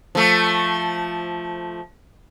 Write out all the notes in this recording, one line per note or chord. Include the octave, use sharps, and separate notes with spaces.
F3 A3